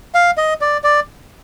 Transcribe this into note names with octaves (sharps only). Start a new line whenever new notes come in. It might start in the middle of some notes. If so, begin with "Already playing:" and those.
F5
D#5
D5
D5